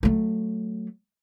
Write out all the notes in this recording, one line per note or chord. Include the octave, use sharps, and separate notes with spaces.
F#3 A3